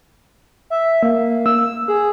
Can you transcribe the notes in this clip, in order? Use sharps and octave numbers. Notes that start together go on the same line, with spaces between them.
E5
A#3
E6
G#4